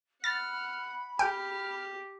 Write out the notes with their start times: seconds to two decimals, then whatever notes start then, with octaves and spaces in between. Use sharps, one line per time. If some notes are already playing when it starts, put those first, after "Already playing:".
0.24 F#5 B5 F6 A6
1.19 G4 G5 F6